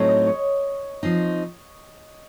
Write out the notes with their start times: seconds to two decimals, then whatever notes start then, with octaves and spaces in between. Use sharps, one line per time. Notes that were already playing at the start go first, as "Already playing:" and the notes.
Already playing: A2 F#3 A3 C4 D#4 C#5
0.08 D#5
0.27 C#5
1.03 F3 C4 D#4